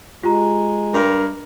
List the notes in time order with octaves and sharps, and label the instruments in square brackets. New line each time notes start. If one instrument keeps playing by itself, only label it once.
[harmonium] G#3 [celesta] F4 G4 A#5
[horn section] G2 A#4